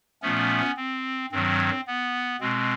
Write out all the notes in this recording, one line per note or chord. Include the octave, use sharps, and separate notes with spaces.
A#2 F3 A3 B3 C#4
C4
G2 D#3 F#3 C4
B3
B2 G#3 C4